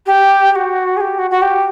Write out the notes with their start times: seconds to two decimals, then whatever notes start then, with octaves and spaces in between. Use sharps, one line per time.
0.06 G4
0.51 G4
0.55 F#4
0.96 G#4
1.00 G4
1.18 F#4
1.30 F#4
1.41 G4